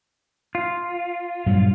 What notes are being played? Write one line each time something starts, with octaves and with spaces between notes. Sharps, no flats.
F4
G2 A#2 F#3